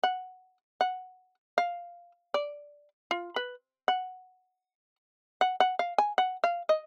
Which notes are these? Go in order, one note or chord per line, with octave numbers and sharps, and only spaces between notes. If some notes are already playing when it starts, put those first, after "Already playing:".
F#5
F#5
F5
D5
F4
B4
F#5
F#5
F#5
F5
G#5
F#5
F5
D#5